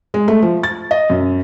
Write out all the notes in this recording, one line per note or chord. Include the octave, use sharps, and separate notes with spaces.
G#3
A3
F3
A6
D#5
F#2